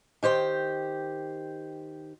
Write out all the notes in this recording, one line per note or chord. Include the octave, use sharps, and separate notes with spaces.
D#3 G4 C5 G5